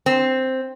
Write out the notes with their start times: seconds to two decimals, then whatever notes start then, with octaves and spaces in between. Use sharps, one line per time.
0.06 C4